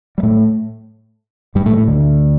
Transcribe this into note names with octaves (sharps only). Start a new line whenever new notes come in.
G3
A2 A3
G2 G3
A2 A3
A2 A3
D2 D3